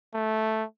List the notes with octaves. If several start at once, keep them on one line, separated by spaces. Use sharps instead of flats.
A3